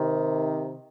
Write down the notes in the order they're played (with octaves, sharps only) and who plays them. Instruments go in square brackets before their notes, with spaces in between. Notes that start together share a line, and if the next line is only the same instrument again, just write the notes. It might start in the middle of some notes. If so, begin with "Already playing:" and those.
Already playing: [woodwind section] C3 D#3